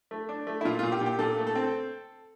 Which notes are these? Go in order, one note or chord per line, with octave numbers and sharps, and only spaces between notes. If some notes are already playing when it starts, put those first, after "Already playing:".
A3
D4
A3
E4
A#2 F4
A#2 F4
G4
A#2
G4
A#2 A4
A3
A4
C4